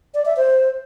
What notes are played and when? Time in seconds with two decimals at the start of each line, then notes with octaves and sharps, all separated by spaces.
0.14 D5
0.26 E5
0.37 C5